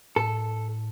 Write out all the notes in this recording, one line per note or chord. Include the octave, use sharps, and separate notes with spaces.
A2 A4